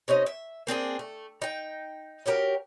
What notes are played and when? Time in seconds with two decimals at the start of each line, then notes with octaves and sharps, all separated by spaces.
0.08 C3 C#4 D#4 D#5
0.26 E5
0.67 A#3 C4 D4 G#4
0.99 A3
1.42 D#4 G5
2.26 C#4 F#4 G4 A#4